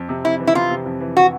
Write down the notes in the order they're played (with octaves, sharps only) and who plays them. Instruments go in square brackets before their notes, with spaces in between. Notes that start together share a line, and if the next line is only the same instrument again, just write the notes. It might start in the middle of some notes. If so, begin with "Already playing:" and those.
Already playing: [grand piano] F2
C3
[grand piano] F2 [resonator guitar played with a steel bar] E4
[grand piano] E3
[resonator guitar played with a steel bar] E4
[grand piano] C3 [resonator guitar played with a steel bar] F4
[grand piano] C3
F2
E3
[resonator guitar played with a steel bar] F#4